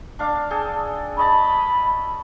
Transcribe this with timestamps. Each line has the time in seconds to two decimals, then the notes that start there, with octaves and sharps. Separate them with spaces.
0.19 D4 F5 D6
0.51 G#4 A4 G5
1.17 C#5 D#5 A5 B5